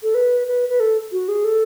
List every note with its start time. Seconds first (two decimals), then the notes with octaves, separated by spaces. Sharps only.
0.03 A4
0.15 B4
0.47 B4
0.69 B4
0.80 A4
1.12 F#4
1.28 G#4
1.44 A4